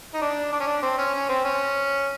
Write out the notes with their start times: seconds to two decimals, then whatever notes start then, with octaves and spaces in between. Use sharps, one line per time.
0.14 D#4
0.21 D4
0.52 D4
0.60 C#4
0.67 D4
0.82 C4
0.98 C#4
1.13 C#4
1.29 C4
1.45 C#4